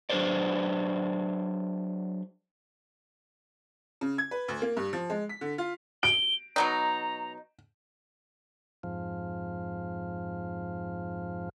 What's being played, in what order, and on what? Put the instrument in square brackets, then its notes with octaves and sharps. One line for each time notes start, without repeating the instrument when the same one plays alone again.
[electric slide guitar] F#3 D4 G#4 B4 C5 D5
[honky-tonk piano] C#3
G#6
B4
D2
A#3
G2
F3
G#3
B6
D3
F4
[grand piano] D7 [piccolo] G7
[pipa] B2 F#3 D#4 [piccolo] A#5
[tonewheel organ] F2 G#2 F3